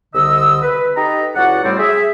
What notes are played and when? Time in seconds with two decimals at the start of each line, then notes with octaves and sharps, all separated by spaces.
0.14 C2 D3 D#5 E6
0.62 B4
0.97 D#4 G4 A4 B4 D#5 A#5
1.35 C#2 F#3 E4 F#4 D5 F#5
1.64 A2 G3 C4 D5
1.79 G#4 E5